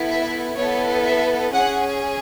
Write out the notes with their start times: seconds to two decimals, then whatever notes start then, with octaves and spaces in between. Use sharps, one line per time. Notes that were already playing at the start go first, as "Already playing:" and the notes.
Already playing: B3 E4 A4
0.10 E5
0.57 B3 E4 A4 C#5
1.05 E5
1.52 C#4 G#4 F#5